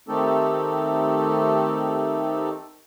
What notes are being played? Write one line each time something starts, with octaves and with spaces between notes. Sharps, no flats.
D#3 A3 C4 D#4 G4 A4